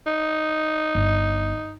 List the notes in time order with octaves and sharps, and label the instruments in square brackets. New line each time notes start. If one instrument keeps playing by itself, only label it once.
[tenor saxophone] D#4
[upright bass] G1